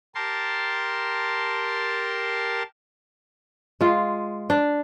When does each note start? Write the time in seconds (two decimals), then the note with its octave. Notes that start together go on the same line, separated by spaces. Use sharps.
0.15 G4 A#4 A5 C6
3.81 G#3 F4
4.50 D4